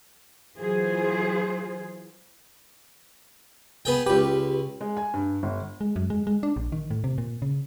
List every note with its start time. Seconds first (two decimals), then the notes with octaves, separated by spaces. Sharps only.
0.57 E3 F#3 F4 G#4 C5
3.85 B3 G#4 G5
4.06 C#2 G4 B4
4.81 G#3
4.97 G#5
5.14 G2
5.43 G1
5.81 G#3
5.96 F#2
6.10 G#3
6.27 G#3
6.43 D4
6.56 A#1
6.72 D#3
6.91 A2
7.04 C3
7.18 A#2
7.42 C#3